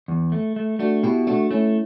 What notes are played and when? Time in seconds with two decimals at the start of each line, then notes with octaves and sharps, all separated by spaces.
0.08 E2
0.32 A3
0.56 A3
0.79 A3 D4 F#4
1.03 B2 E4 G4
1.27 A3 D4 F#4
1.51 A3 C#4 E4